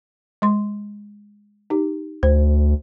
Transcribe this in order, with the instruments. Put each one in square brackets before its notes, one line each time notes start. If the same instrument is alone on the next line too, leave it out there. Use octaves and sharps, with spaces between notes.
[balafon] G#3 C6
D#4 G4
[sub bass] D2 [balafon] C5